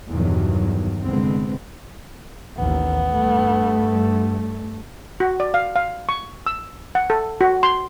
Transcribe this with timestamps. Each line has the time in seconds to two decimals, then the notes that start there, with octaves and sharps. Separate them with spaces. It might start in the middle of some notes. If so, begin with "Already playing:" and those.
0.11 E2 G2 B2 D#3 F#3
1.04 C2 D3 G#3 B3 C4
2.57 A1 D#2 B3
3.09 G2 A3
5.20 F#4
5.40 D5
5.54 F5
5.76 F5
6.09 C#6
6.46 E6
6.95 F#5
7.10 A4
7.41 F#4
7.63 C6